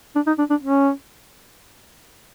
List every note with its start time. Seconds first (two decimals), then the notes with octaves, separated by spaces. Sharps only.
0.15 D4
0.27 D#4
0.39 D4
0.50 D4
0.62 C#4